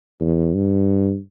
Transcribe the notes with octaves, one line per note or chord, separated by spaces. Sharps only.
E2
G2